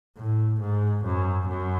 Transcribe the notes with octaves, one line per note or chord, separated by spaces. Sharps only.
A2
G#2
F#2
F#2